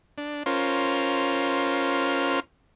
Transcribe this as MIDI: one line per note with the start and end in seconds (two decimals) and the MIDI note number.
0.18 0.43 62
0.46 2.40 61
0.46 2.40 65
0.46 2.40 70
0.46 2.40 72